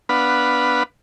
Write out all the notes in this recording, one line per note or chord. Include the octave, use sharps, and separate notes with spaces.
B3 D4 B4 F5 F#5 B5